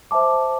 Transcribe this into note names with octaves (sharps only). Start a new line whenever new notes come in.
C5 E5 A5 D6